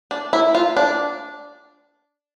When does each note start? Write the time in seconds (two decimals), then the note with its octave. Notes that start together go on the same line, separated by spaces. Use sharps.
0.11 D4
0.33 E4
0.55 F4
0.77 D4